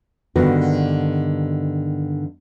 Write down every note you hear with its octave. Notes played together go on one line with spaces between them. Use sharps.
G2 D3 D#3 B3 D4 F#4